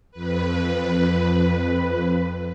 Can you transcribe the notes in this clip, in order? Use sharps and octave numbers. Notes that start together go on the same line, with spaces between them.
F2 B4